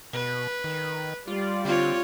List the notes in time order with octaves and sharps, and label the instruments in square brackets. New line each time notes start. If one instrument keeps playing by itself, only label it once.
[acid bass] B2 [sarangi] B4
[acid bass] D#3
[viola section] G3 D5 [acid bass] F4
[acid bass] D3 [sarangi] C4 [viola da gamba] F4 C#5